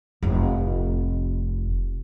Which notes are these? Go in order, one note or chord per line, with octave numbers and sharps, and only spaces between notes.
F1 A2